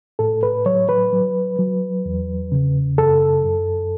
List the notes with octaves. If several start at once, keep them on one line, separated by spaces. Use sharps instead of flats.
A2 A4
B4
F#3 C#5
B4
F#3
F#3
E2
C#3
F#2 A4
F#2